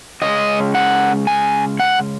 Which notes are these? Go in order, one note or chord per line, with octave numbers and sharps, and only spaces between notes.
C#3 G#3 C#4 D#5
F#5
G#5
F#5